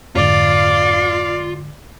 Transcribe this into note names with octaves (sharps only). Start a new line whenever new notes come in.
F2 G#2 D3 F4 D5